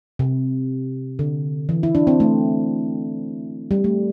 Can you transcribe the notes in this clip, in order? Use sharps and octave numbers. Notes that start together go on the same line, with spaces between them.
C3
D3
E3
E4
D4
C4
A3
G3
A3